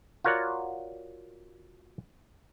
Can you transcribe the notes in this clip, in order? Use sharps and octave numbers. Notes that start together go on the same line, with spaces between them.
F4 F#4 A#4 C#5 D5 F#5